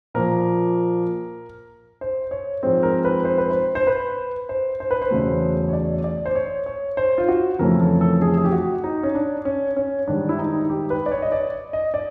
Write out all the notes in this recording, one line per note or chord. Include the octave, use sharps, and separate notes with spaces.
A#2 F3 A#3 A#4
C5
C#5
G#2 F3 G#3 C4 C5
A#4
B4
C5
B4
C5
C5
B4
C5
C5
B4
C5
E2 C#3 F#3 A3
C#5
D5
D5
C5
C#5
C#5
C5
F4
F#4
F2 C#3 E3 A3 C#4 A#4
A4
A4
G#4
G#4
G4
F#4
D#4
C#4
D4
C#4
C#4
G#2 D#3 G3 D4
E4
D#4
G4
B4
D5
C#5
D#5
D5
D#5
D5